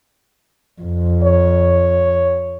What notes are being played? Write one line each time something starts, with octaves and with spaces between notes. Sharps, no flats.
F2
C#5